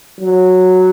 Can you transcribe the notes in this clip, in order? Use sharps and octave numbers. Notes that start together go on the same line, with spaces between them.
F#3